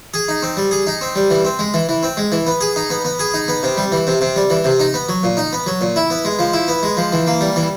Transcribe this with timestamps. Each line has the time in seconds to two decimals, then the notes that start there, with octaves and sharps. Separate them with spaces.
0.14 G#4
0.28 D#4
0.43 C4
0.57 G3
0.71 G#4
0.87 D#4
1.01 C4
1.16 G3
1.30 E3
1.45 C4
1.59 G#3
1.74 E3
1.89 E3
2.03 C4
2.17 G#3
2.32 E3
2.47 B3
2.61 G#4
2.76 D#4
2.90 B3
3.05 B3
3.19 G#4
3.34 D#4
3.48 B3
3.63 C3
3.77 G3
3.92 E3
4.07 C3
4.21 C3
4.36 G3
4.50 E3
4.64 C3
4.80 D#4
4.94 B3
5.08 F#3
5.23 A#2
5.37 D#4
5.53 B3
5.66 F#3
5.81 A#2
5.96 E4
6.10 B3
6.25 G#3
6.39 F3
6.53 E4
6.68 B3
6.83 G#3
6.97 F3
7.12 E3
7.27 A#3
7.41 G3
7.56 E3